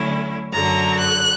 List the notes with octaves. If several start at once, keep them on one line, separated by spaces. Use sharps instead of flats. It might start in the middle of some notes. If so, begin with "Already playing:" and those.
Already playing: D2 D3 F#3 C#4 E4
F#2 D3 F#3 A#5
F#6